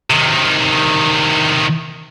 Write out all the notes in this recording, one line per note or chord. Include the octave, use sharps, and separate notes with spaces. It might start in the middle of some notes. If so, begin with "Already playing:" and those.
C3 D#3